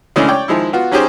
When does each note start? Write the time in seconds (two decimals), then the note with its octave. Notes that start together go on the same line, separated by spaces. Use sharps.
0.16 C#3 E3 G#3 A3 C#4 D4
0.28 C#5 D5 G5 D6
0.48 D#3 F3 G#3 E4
0.73 B3 F4 F#4
0.92 F#3 C#4 D#4 G4 G#4 C5